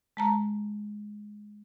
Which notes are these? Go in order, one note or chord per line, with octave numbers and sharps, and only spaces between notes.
G#3 A5 A#5